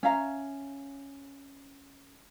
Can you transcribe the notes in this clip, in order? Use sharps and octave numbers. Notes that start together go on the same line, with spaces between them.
C#4 E5 F5 A#5